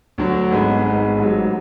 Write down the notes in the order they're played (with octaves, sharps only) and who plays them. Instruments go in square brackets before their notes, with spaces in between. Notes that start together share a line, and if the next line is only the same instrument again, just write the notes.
[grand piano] D2 D3 F#3
G#1 G#2 G#3 B3
G#1 G#2 G#3 B3
A1 G#2 F#3